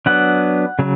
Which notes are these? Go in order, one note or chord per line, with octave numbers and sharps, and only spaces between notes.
F#3 B3 D4 F#5
C#3 F#3